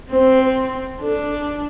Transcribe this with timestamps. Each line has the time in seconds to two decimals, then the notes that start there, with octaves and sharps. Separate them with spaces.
0.11 C4 C5
1.01 D4 A4